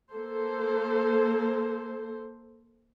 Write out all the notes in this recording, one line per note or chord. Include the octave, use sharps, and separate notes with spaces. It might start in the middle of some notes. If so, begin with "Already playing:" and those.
A#3 A4 C5